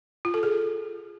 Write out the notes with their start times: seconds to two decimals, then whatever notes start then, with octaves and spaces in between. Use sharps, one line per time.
0.25 F4
0.34 A4
0.43 G#4